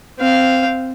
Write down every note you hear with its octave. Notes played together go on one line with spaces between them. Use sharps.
C4 F5